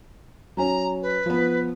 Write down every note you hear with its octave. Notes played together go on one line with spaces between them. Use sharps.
F#3 C#4 A#5
B4
F3 B3